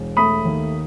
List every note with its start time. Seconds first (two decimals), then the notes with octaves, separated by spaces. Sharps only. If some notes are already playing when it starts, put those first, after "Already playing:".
Already playing: E1
0.17 A3 B5 D#6
0.45 D#2